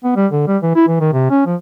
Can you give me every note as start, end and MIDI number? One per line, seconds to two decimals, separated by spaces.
0.04 0.14 59
0.16 0.27 55
0.32 0.43 50
0.48 0.57 55
0.63 0.71 52
0.75 0.87 64
0.88 1.00 52
1.00 1.09 51
1.12 1.29 48
1.30 1.43 61
1.46 1.55 53